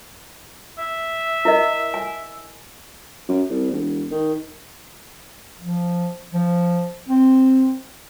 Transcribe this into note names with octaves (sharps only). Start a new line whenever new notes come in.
E5
E4 A#4 D#5
G#5
F#2
C2
E1
D#3
F3
F3
C4